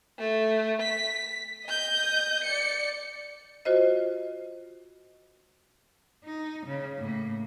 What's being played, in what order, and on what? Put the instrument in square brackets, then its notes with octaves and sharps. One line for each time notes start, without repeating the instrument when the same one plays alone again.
[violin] A3
B6
D#5 G6
D5 C#7
[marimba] F4 F#4 C5 D#5
[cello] D#4
C#3
A2 A#3